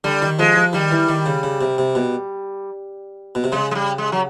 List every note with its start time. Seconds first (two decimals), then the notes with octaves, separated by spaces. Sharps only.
0.04 D3 G3
0.22 D#3
0.39 F3 G#3
0.56 F3
0.73 D#3 G3
0.91 E3
1.09 D#3
1.26 C#3
1.43 C#3
1.61 C3
1.78 C3
1.95 B2
3.35 B2
3.44 C3
3.52 C#3 G#3
3.71 G#3
3.75 G3
3.98 G#3
4.12 F#3